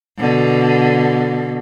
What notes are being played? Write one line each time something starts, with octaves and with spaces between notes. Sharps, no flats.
B2 D3